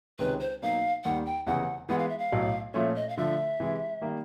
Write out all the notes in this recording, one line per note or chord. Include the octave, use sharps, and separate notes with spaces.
C#2 C3 D#3 G#3 C#4 B4
C5
B2 F#3 A#3 D#4 F5
D#2 D#3 G3 F#5
G5
F1 E2 C#3 E3 F#5
E3 G#3 B3 F#5
F5
E5
F5
B1 A2 F#3
A#2 F3 A3 C#4 E5
D#5
F5
D3 F3 A3 E5
C3 E3 G#3
D#3 G3 A#3